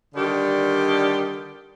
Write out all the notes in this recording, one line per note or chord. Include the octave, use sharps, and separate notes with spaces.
D3 D#3 G3 G4